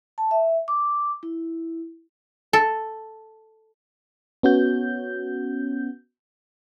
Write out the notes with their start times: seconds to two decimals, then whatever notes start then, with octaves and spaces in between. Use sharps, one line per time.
0.18 A5
0.31 E5
0.68 D6
1.23 E4
2.53 A4
4.43 B3 C#4 F#4 G6